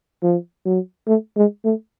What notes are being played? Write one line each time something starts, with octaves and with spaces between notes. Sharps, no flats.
F3
F#3
A3
G#3
A3